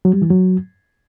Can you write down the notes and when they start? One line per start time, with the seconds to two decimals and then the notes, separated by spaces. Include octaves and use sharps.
0.05 F#3
0.13 G3
0.22 E3
0.30 F#3